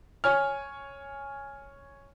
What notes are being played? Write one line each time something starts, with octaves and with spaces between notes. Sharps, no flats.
C#5 G#5 F6